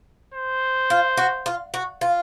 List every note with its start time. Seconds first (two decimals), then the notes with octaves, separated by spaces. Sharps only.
0.34 C5
0.90 F4
1.17 F#4
1.46 F4
1.74 F#4
2.01 F4